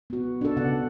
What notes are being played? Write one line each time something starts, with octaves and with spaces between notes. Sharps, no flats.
B3 F#4
D4 A4
C#3 B3 D5 F#5